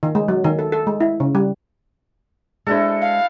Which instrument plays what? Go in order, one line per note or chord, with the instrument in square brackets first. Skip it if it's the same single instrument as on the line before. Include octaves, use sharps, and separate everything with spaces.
[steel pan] D#3
G#3
F#3
D#3
A4
A4
G#3
E4
C#3
G3
[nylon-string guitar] G#3 D4 C5 [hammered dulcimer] E4 F#4 A4
[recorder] F5